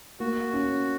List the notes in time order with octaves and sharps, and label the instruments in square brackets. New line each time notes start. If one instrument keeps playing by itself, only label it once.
[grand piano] A#3 [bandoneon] F#4
[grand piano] C#4